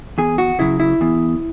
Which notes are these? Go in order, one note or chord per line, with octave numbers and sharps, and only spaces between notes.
E2 G#4
F#4
C#3 F#3 E4
E4
E2